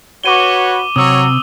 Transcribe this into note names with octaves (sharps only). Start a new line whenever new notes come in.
F#4 B4 C#5 D6 D#7 G7
C3 F#3 C#5 A#5 D#6 E6